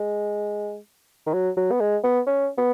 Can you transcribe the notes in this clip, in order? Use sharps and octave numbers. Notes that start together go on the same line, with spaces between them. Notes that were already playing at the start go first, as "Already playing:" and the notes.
Already playing: G#3
D#3
F#3
F#3
B3
G#3
B3
C#4
B3